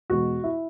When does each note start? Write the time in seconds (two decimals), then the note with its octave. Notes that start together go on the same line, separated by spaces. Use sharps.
0.10 E2 B2 G#3 B3 F#4
0.44 E4